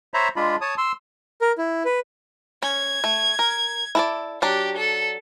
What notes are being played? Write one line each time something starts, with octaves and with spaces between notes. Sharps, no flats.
C5 C#5 E5 A#5 B5
G#3 D4 F4 B5
C#5 A5 D#6
C6 E6
A#4
E4
B4
C#4 G#6
A3
A#4
E4 A4 D5
F#3 D4 G4
A4